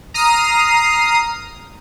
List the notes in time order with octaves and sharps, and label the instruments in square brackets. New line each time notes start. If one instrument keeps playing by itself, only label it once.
[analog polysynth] A#5 D#6 F6 C7 D#7